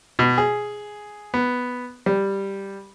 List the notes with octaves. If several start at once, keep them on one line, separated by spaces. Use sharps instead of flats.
B2
G#4
B3
G3